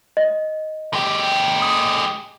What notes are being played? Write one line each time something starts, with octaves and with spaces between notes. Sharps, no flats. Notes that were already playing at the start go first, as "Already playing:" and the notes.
D#5
G#3 G4
D#6